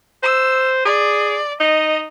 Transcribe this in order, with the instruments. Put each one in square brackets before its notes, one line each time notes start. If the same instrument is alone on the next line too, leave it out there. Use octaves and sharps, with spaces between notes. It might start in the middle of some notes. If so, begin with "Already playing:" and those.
[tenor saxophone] C5 [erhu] E6
[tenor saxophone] G#4 [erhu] D5
[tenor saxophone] D#4 [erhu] D#5